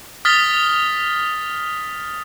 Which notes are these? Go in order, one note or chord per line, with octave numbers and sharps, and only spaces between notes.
D#6 F6 A6 B6 G7